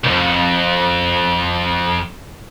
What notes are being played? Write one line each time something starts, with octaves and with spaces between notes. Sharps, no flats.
C2 F2